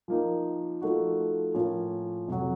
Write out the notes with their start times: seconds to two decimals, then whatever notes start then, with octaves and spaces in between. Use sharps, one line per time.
0.08 F3 A#3 D#4
0.82 F3 A3 D#4 F#4
1.55 A2 F3 A#3 C#4
2.28 F2 C3 F#3